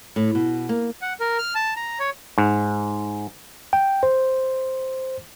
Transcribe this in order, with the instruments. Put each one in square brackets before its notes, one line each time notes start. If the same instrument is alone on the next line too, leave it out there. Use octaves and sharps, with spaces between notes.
[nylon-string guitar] A2
B2
A#3
[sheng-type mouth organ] F#5
A#4
F6
A5
A#5
C#5
[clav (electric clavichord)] G#2
[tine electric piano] G5
C5